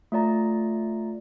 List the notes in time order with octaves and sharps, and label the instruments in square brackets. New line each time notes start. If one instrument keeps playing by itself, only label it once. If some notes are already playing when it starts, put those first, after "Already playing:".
[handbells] A3 F4 D5 A#5